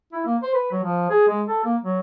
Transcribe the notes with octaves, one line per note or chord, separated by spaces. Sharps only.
E4
A#3
C5
B4
F#3
F3
G#4
G#3
A4
A#3
F#3